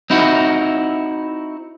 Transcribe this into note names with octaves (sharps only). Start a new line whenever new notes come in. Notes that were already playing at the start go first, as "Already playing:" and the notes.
C4 D#4 E4 F#4